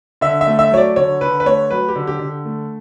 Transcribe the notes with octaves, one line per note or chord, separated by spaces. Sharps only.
D3 E5
E5
A3
E5
F#3 C#5
D5
D3 C#5
D3 B4
B4
A3 C#5
F#3 B4
G4
D3
G4
D3
A3